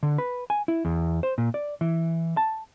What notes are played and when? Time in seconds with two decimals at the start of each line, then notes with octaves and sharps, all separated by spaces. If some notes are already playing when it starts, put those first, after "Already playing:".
0.03 D3
0.18 B4
0.50 G#5
0.68 E4
0.85 E2
1.23 C5
1.38 A#2
1.54 D5
1.81 E3
2.37 A5